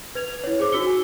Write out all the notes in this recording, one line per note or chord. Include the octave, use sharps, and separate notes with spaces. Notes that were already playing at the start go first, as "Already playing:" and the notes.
B4 G#6 F7
E4 C#5
G#4 C5 D6
D#4 F#4 E6 C#7 G7
G#5